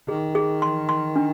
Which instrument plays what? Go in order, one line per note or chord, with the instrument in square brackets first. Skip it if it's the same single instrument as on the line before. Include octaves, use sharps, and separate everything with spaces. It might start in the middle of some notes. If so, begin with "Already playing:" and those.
[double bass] D#3 [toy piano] G#4
[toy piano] G#4
C6
C6
D4